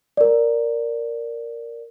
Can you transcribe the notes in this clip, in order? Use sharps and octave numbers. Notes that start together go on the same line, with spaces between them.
A#4 D5